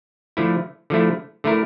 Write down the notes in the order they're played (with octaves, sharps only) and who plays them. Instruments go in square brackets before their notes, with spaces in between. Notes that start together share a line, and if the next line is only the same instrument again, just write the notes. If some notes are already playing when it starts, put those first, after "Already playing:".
[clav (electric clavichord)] D3 F3 A3 E4
D3 F3 A3 E4
D3 A3 E4 A#4